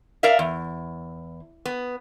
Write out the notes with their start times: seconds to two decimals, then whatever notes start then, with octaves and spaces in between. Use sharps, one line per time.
0.23 A#4 D5 E5 F5
0.39 E2
1.65 B3